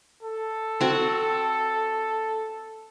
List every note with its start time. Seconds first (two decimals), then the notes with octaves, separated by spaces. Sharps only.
0.23 A4
0.81 C4 F#4